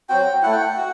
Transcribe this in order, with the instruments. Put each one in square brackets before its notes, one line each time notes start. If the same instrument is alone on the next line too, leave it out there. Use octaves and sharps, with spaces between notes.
[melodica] F#3 C4 F#4 G5
A3 E4 F#5
G5
F#5
F#4